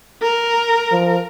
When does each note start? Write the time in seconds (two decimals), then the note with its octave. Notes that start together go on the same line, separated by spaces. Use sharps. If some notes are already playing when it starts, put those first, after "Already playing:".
0.22 A#4
0.91 F3